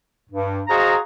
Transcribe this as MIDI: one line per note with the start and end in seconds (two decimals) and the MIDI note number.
0.30 0.60 43
0.68 0.95 66
0.68 0.95 68
0.68 0.95 72
0.68 0.95 75
0.68 0.95 77
0.68 0.95 82